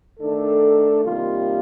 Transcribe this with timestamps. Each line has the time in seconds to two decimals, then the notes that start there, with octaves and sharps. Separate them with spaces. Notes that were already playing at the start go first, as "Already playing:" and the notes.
0.20 D#3 A3 D4 A4
1.04 C3 D#3 G3 A#3 F4